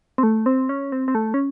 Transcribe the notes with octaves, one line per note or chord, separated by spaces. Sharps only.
C4
A3
C4
C#4
C4
C4
A3
C#4